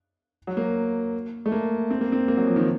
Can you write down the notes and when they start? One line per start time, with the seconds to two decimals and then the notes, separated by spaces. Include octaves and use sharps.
0.47 F#3
0.57 A#3
1.46 A3
1.52 A#3
1.90 C4
2.01 A#3
2.12 C4
2.28 A#3
2.37 F#3
2.47 F3
2.56 D#3